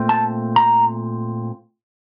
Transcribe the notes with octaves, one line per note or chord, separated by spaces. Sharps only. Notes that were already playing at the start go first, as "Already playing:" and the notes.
Already playing: A#2 A3 C4
A5
A#5